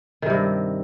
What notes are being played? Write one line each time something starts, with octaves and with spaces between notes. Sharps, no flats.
G2 C3 D#3